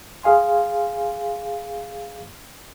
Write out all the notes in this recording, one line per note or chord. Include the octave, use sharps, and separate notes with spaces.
G#4 F5 G#5 C6